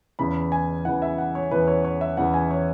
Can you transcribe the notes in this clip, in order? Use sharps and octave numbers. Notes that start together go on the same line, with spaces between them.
E2 C#3 E3 B5
G#5
E2 C#3 E3 F#5
E5
F#5
C#5
E2 C#3 E3 B4
C#5
C#5
E5
E2 C#3 E3 F#5
G#5
C#5